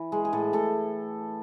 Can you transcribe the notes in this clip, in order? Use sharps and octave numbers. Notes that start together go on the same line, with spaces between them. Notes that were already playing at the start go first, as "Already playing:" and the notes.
Already playing: E3
G#3
G#4
A2 A4
A2 A4